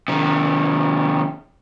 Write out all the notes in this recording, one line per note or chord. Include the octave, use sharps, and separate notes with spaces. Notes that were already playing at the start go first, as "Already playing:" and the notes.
C3 D#3